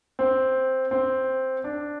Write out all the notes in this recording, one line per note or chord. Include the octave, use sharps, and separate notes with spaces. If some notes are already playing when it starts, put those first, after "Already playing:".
C4
C4
D4